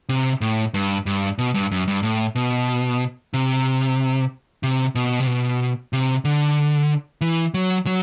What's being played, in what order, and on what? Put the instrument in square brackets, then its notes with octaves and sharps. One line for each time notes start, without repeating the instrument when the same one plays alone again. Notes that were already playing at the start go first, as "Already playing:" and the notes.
[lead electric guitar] C3
A2
G2
G2
B2
G2
F#2
G2
A2
B2
C3
C3
B2
C3
B2
C3
D3
E3
F#3
F#3